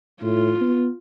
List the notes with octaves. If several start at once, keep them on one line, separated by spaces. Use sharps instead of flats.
A2 F4
B3